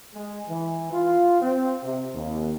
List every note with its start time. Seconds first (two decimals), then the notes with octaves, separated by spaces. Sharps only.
0.13 G#3
0.48 E3
0.93 F4
1.41 C4
1.82 C3
2.15 D#2